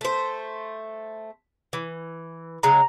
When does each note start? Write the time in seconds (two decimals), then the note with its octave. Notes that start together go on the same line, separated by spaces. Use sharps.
0.01 A3 C5
1.73 E3
2.63 C#3 F#3 G#3 A#5